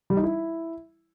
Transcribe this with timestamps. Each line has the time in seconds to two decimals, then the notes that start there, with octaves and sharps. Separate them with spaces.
0.10 G3
0.17 D#4
0.23 E4